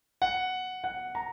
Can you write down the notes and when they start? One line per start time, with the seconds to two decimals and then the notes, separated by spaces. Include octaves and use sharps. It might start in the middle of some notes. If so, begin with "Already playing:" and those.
0.22 F#5
0.84 F#5
1.15 A#5